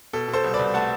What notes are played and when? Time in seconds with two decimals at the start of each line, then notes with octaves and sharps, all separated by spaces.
0.13 B2 A4
0.28 B2
0.33 A4 C5
0.44 C2
0.54 B4 D5
0.59 C2
0.74 A3 F#5 A5